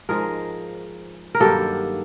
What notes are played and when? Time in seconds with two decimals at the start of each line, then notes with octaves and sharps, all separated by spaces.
0.09 G#2 F3 G#3 G#4 A#4
1.35 A#4
1.40 G2 D#3 F#3 A#3 G4 A4